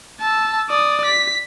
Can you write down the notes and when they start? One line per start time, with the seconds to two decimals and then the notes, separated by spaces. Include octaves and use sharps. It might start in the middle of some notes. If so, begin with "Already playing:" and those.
0.20 A5 E6
0.70 D5 D#6
1.06 B6